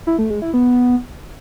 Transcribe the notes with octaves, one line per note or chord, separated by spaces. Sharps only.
E4
A3
G#3
E4
B3